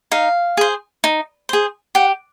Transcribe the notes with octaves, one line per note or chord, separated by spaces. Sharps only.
D#4 F5
G#4 C5
D#4
G#4 C5
G4 F#5